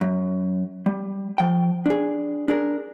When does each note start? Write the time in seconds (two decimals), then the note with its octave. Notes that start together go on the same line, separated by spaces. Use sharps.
0.01 F#2
0.86 G3
1.38 F3 G5
1.86 D4 G#4
2.48 D4 G#4 A#4